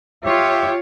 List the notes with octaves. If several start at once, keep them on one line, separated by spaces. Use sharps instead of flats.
F4 G4 C#5 E5